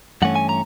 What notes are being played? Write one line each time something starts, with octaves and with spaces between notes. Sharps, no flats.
G2 E3 A3 C#4 F#5
G#5
A#5